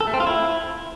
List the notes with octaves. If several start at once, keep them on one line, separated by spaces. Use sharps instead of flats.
A4
A3
C4
F4
E4